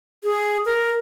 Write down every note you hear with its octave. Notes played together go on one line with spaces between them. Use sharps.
G#4
A#4